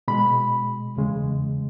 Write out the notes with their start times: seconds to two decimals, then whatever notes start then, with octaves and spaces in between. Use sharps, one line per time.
0.08 B2 G#3 B5
0.96 E2 C#3 G#3